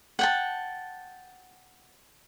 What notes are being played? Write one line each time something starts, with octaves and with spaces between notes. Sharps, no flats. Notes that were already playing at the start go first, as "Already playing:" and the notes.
F#5 G5 A5